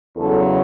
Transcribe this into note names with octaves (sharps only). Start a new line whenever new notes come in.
E2 C#3 F#3 A4